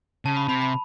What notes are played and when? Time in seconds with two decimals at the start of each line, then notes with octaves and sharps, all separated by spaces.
0.25 C#3 A5
0.37 B5
0.48 C3 B5
0.62 B5